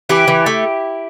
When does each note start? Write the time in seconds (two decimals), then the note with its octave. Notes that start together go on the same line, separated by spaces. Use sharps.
0.09 E3 E4 G4
0.28 E3
0.46 A3